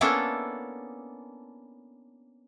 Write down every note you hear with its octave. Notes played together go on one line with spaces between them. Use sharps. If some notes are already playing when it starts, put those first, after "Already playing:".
A#3 B3 C#4 D4 E4 A4